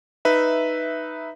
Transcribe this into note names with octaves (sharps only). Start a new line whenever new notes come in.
D#4 B4 E5